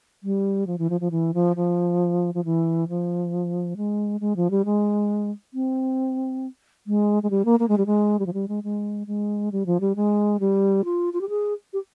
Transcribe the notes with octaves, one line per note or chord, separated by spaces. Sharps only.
G3
F3
E3
F3
F3
E3
F3
F3
F3
E3
F3
G#3
G#3
F3
G3
G#3
C4
G#3
G#3
G3
A#3
A#3
G#3
G3
G#3
G3
F3
G3
G#3
G#3
G#3
G3
F3
G3
G#3
G3
F4
F4
G4
G#4
G4